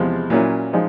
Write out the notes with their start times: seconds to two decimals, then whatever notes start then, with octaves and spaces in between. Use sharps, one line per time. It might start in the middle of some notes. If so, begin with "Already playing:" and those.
Already playing: E2 C3 F3 G#3
0.30 A#2 F#3 A#3 C#4 E4
0.73 F3 G#3 D#4